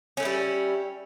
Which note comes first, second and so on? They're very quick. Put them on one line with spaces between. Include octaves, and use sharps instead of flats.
C#4 A3 E4 G3